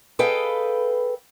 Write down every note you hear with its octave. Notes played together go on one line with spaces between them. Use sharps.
G#4 A4 B4 D#5 F5 G5